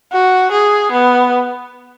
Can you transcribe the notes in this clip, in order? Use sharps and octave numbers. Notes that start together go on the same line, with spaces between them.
F#4
G#4
B3